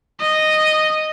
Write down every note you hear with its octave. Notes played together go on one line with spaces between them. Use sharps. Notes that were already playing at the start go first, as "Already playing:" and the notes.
D#5